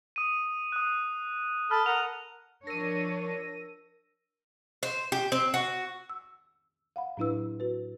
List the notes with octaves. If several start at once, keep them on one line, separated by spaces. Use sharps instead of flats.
D#6 D#7
D#6 F#6
A4 A5 B5 F6
A#4 F#5 F7
F3 D4 A#4 C#5 E6 A#6 D#7
C5
G4
C4
F#4
E6
F5 F#5 B5
A2 F#3 D4 E4 B4 E6
F#4 B4